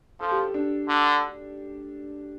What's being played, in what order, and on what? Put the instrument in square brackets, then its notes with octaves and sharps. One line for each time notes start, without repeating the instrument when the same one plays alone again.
[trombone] F3 [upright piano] A4
[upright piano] G4
G4
D4
[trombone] D3